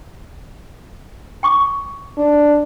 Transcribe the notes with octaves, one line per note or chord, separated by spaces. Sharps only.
G5 C#6 D6
D4